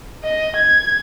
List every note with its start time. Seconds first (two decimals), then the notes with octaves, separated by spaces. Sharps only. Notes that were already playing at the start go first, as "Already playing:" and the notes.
0.24 D#5
0.57 G#6